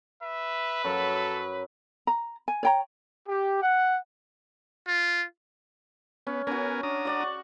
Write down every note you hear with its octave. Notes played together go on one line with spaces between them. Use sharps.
B4 E5
F#2 A4
A#5
G#5
C#5 G5 A#5
G4
F#5
F4
B3 C#4
B3 C#4 F#4 A#4 G#5
D4 A#5 D#6
F#4 D5 F#5
C#6